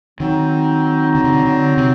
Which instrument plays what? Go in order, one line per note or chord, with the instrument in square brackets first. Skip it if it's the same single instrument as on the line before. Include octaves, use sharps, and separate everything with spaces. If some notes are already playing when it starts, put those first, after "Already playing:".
[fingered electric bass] D#3 [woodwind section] F#3 C4 D#4
[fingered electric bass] D3
C3
D3
D3
C3